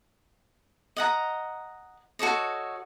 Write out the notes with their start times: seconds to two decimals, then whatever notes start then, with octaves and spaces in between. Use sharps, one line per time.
0.97 D#5 F#5 A#5
2.19 F#4 A4 C#5 D#5